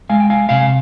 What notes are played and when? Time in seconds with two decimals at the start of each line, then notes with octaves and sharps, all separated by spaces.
0.09 G#3 F5 G#5
0.20 G5
0.30 F5 G#5
0.49 C3 F5 G#5